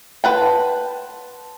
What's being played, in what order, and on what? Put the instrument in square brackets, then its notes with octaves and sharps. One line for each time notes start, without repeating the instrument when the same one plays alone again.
[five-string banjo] B4 F#5 G5 [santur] A5 C6